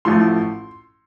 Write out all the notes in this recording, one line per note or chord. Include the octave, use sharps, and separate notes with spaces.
A1 A2 F3 A3 C6